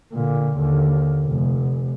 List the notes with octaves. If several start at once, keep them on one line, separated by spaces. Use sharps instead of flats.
A#2 D3
D#2 D3
F1